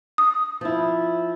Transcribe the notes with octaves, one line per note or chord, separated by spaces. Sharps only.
D#6
F3 E4